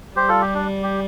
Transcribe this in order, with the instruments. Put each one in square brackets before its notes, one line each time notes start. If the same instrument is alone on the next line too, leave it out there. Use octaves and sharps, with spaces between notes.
[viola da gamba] G3 [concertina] G4 C5
[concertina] F4 A4
G4
D4
G4